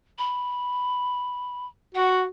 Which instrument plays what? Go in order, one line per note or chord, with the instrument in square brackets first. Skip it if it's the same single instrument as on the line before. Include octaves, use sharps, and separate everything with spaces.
[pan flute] B5
[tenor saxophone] F#4 [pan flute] F#5